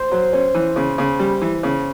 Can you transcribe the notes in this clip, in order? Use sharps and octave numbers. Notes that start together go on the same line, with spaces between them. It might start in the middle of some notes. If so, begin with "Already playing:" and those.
Already playing: C5
F#3
C#4
E3
C#3
C#3
G3
E3
C#3